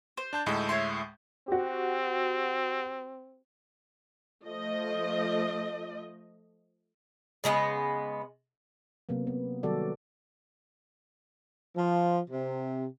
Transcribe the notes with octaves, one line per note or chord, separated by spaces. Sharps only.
C5
D4 A5 G6
D2 A2 G#3 D#4 A4
C#5 E5 C6
C4 F#4 G4
F3 A3 D#5
C#3 G#3 A3 B3
C3 F#3 A#3 B3
B3
D#3 F#3 G3 F#4 A4 D5
F3
C3